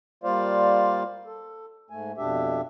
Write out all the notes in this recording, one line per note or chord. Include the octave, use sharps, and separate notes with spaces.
G3 A#3 F4 C5 D5 F5
A4
G#2 A3 G#5
F2 B2 D4 G4 E5